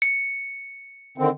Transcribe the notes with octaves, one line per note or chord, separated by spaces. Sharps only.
C#7
D3 D#3 C4